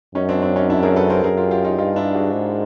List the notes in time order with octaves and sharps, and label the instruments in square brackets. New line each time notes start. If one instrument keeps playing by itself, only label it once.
[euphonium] F#2 [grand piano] C#4 D#4
[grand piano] C4 D4
C4 D4
C#4 D#4
D4 E4
G#4 A#4
A4 B4
A#4 C5
[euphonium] F#2 [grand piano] G#4 A#4
[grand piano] F4 G4
F4 G4
D#4 F4
[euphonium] G2 [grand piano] D#4 F4
[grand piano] D4 E4
F#4 G#4
[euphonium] G#2